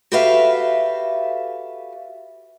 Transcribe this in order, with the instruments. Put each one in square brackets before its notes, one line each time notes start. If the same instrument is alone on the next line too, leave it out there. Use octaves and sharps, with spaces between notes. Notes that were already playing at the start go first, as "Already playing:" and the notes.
[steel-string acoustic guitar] F#4 G4 A4 B4 E5 F5